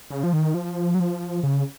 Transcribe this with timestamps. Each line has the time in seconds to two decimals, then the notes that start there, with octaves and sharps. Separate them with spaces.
0.11 C#3
0.24 F3
0.33 D#3
0.54 F3
0.95 F#3
1.00 F3
1.43 C#3